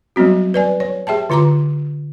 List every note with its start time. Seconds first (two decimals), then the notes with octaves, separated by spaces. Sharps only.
0.16 F#3 G3 B3 C4 F#4
0.54 B4 D5 G#5
0.80 C#5
1.07 G4 G#4 E5 G5 A5
1.30 D3 F4 A#5 C6 D6